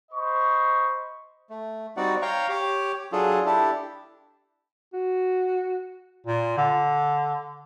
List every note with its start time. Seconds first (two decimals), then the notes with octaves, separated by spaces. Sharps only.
0.12 C5 D#5 B5 C#6
1.50 A3
1.97 G3 C4 D#4 F#4 D5 F#5
2.22 C#5 F5 G5 A#5 C#6
2.49 G4 C#5 D6
3.12 F#3 D4 F4 G#4 A4
3.46 D4 E4 G4 A4
4.94 F#4
6.27 A#2
6.57 D3